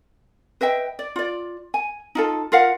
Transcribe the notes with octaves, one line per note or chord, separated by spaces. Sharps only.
B4 D#5 E5 G5
D5
F4 D5
G#5
D#4 F4 A4
F4 A#4 F5 F#5